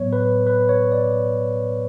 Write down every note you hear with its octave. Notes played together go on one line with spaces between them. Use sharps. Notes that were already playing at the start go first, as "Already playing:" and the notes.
Already playing: A2 F#3 B3 C#5
B4
B4
C#5
D5